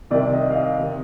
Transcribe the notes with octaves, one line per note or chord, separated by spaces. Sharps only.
C2 C3 D#3 D5
D#5
F5
D#5
C3 D#3